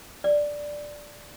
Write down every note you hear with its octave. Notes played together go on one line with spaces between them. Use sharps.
D5